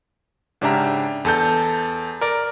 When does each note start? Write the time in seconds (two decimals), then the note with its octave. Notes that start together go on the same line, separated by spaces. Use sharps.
0.61 G#2 C#3 D4 G4 E5 A#5
1.25 E2 A4 G6
2.21 A#4 D5 D7